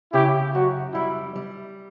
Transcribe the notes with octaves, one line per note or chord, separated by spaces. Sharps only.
C#3 E4 G4
F#2 F#4
G3 E4
G3